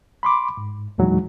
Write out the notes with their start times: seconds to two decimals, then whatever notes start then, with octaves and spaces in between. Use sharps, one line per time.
0.23 B5 C6 D6
0.57 G#2
0.98 E2 A#2 E3 F#3 G#3 D#4